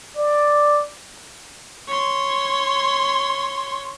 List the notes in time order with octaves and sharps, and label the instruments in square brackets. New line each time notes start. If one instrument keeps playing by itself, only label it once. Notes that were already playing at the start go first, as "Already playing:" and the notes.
[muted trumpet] D5
[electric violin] C#5 C6